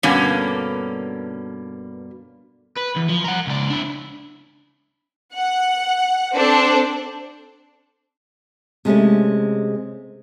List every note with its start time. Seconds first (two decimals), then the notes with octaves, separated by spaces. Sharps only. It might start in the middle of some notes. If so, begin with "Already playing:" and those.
0.03 G2 B2 D3 A#3 C#4
2.77 B4
2.96 E2
3.09 F3
3.24 A#4 F#5
3.47 C#2 D5
3.70 D4 E4
5.33 F#5
6.34 C4 D4 A4 C5
8.85 C3 G#3 A3 C#4